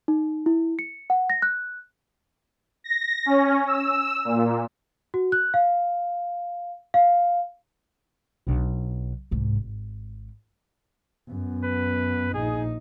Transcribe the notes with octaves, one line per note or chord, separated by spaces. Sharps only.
D#4
E4
C#7
F#5
A#6
F#6
A#6
C#4
E6
A#2
F#4
F#6
F5
F5
B1 D4
C2 G#2
G#1
F#2 B3
B4
A#1 D#4 G#4